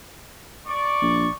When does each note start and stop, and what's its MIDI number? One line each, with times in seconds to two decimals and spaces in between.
0.66 1.35 74
0.66 1.35 85
1.02 1.27 34